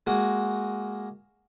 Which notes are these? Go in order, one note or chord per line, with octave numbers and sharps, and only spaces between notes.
G#3 A#3 F#4